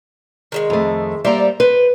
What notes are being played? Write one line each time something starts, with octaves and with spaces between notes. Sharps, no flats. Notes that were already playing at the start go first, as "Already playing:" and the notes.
D#3 G3 G#3
F2 A3
G3 A#3 C5 D5 E5 A#5
B4 C5